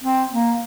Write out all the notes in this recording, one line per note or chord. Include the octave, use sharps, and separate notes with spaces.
C4
A#3